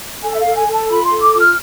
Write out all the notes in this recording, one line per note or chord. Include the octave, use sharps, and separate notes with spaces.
A4 G#5
E5
F5
A4
G#5
A4
A5
F4 B5
C6
A4
D6
F4
F6